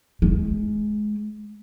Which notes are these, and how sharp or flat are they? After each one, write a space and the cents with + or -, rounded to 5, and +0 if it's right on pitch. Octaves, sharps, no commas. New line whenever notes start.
G#3 +20